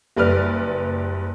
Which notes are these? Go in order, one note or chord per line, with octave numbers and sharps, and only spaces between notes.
F#1 G3 B4 D5 F6